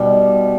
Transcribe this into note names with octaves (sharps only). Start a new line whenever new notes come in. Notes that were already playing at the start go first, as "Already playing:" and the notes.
Already playing: B2 D#3 G3 G4